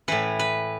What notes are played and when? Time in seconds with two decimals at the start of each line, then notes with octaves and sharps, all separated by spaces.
0.08 A2 E3 B4
0.39 B4